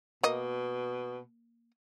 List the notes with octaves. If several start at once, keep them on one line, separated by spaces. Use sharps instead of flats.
B2 A#3 D#5